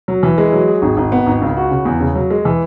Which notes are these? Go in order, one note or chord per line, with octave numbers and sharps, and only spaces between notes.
F#3
E3
G#3
F#3
G#4
G#1
G#1
B3
G#1
C#2
F#4
C#3
E2
C#3
F#3
G#3
E3